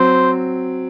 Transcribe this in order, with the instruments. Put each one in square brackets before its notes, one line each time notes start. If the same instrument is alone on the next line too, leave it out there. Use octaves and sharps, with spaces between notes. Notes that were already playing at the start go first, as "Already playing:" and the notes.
Already playing: [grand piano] F#3 C4 [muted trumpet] C5